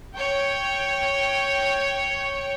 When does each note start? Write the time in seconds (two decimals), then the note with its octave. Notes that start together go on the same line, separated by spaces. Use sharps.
0.14 C#5 G5